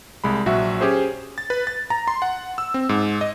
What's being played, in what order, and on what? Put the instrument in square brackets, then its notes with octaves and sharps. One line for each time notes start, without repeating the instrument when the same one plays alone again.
[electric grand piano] C2 G#3 B5
A#1 F#3 F#4 E5
C#4 G4 G#4 C5
A6
B4
A6
A#5
C6
F#5
E6
C4
G#2
D#5